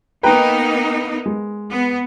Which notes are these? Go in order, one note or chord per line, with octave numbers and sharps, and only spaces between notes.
A#3 B3 D#4 B4 G5 A#5
G#3
B3